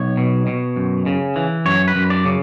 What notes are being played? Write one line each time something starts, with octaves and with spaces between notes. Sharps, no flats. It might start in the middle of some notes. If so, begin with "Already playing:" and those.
Already playing: B1 C#5
B2
B2
F#2
C#3
E3
F#2 C#5
B4
F#2
D5
C#3